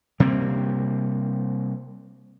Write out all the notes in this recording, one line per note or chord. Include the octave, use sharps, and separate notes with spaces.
C3 G3 A#3 C4